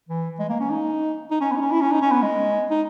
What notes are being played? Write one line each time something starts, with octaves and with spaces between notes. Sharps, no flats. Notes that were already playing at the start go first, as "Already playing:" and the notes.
E3
G#3
A#3
C#4
D#4
D#4
C#4
B3
D#4
C#4
E4
C#4
D#4
C#4
B3
G#3
D#4